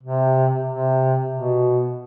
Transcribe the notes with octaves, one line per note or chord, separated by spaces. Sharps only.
C3
C3
B2